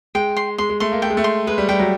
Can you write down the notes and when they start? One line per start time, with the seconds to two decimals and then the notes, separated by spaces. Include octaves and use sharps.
0.15 G#3 G5
0.37 C6
0.58 G#3 C6
0.70 G#3
0.80 A3 C6
0.92 A#3
1.02 A3 G5
1.10 G#3
1.17 A3
1.24 C6
1.47 G#3 B4
1.58 G3
1.69 G3 G5
1.80 F#3